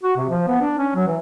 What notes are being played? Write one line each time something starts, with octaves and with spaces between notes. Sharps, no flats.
F#4
C3
F3
B3
D4
C#4
F#3
E3